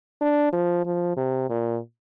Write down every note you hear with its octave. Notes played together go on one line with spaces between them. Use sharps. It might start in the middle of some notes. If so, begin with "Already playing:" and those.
D4
F3
F3
C3
A#2